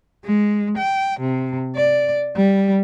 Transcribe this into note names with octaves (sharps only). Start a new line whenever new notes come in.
G#3
G5
C3
D5
G3